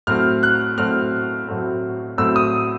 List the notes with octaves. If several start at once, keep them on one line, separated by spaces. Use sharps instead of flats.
A2 F#3 A3 C4 F6
F#6
A2 F#3 A3 C4 F6
A2 F#3 A3 C4
A2 F#3 A3 C4 E6
D#6